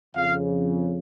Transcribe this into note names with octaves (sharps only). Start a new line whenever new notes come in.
F2 C#3 F5